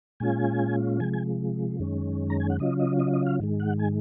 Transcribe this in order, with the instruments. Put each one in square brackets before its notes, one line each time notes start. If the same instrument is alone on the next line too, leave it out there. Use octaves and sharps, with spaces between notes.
[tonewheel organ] A#2 G#3 C#4 F4 G#5
C3 F3 G#3 G#5
G#5
F#2 D#3 G#3 C#4
A#5
G#5
F#5
C#3 F#3 C#4 F4 D#5
D#5
D#5
D#5
F5
G#2 D#3 G#3
F#5
G#5